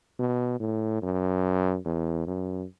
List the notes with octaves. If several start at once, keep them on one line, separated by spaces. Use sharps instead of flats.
B2
A2
F#2
E2
F#2